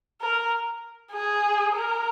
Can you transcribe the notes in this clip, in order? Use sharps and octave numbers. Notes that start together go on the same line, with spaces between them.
A#4
G#4
A#4